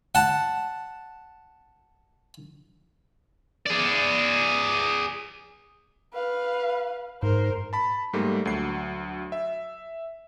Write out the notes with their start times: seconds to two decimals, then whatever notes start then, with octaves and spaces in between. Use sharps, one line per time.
0.15 F#5 A5
3.66 G#4 D5
6.13 B4 F5
7.23 G#2 A#4 C5
7.73 A5 B5
8.13 G#2 G3 A3 A#3
8.45 D2 F#3 C7
9.32 E5